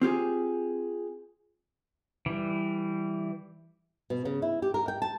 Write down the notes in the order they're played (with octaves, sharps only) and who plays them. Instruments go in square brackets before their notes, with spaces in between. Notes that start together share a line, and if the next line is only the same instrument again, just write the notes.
[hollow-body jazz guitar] C4 F4 G4 G#4
[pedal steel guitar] E3 G3
[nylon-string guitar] B2
C#3
E4
G4
A#4
G5
A5